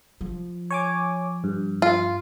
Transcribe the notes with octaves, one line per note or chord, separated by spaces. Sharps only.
F3
C#5 G#5 D6
G2
F4